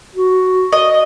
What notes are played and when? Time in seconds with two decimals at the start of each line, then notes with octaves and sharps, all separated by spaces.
0.15 F#4
0.73 D#5